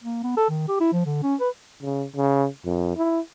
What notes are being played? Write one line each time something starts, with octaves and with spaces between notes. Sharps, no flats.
A#3
B3
A4
D#3
G4
E4
F3
D3
C#4
B4
C#3
C#3
F2
E4